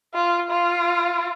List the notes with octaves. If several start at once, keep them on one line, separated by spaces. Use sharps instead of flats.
F4
F4